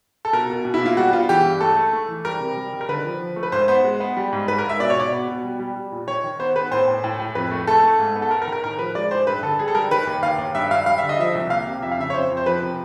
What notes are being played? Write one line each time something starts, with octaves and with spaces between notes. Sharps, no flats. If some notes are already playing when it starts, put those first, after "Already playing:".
A4
B2 A#4
B2
B2
E4
A#3 F4
G3 F#4
B3 F4
E3 G4
G2
A3 A4
A3
A3
E3
G3 A#4
C3
G3
D#3
A#4
D3 B4
F3
F3
A3
B4
G#2 C5
B3 C5
G#3
B3
G3
G#2
G#2 B4
A#4
G#2
E5
B2 D5
C#5
B2 D5
B3
B2
G3
G3
G3
A#2
D#3 C#5
D#3
B3 C5
B3 B4
A2 C5
A2
A2
A2
F2 B4
A3
A3 A4
A3
G#2
B3
A4
B3 A#4
A#4
D#3
A#4
A2 A#4
F3 B4
G#3 D5
A2 C5
G2 B4
D3 A4
G3 G#4
A4
G3 A#4
D#3 B4
D#2
D#2 F5
D#2
G2 E5
G3 F5
G3 F5
E5
D3
D#5
F3 E5
C2
A#3 F5
C3
F2 E5
F5
C#3 E5
C#5
F2 C5
F2
C5
F3 B4
C3